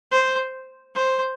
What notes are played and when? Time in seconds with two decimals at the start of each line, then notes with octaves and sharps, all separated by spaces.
0.12 C5
0.95 C5